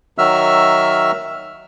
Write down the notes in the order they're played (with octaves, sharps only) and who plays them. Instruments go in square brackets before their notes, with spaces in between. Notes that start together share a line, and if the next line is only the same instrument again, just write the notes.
[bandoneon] D#3 F#3 F#4 E5 E6 F6